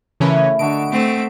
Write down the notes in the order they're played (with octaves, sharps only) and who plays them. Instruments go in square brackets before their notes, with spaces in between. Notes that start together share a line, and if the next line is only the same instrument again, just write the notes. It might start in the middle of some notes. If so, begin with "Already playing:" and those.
[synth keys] C#3 E3 C#4 [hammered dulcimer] A3 E4 A#4
[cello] D3 [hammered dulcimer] F#4 A4 D#5 [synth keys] D7
[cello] A3 C4